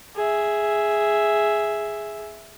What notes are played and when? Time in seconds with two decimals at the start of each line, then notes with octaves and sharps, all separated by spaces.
0.16 G#4 E5